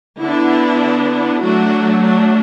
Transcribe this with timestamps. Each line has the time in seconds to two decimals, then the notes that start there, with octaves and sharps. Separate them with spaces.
0.19 D3 B3 D4 E4
1.41 F#3 A3 D4 F#4
2.02 D4